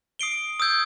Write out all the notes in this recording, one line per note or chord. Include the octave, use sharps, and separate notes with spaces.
D#6 C7 D7 G7
D#6 E6 G6 G#6